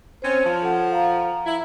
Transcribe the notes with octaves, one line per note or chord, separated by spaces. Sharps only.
C4 C#4 C5
F3 A5
A4 F#5
F5 A#5
E4